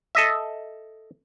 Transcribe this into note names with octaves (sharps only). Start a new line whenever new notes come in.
A4 D#5 E5